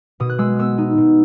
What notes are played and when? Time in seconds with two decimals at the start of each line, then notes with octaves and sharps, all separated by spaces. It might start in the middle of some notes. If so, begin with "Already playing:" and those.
0.20 B2 D#6
0.30 F#6
0.38 G#3 E6
0.59 B3 E6
0.78 D#4
0.97 B2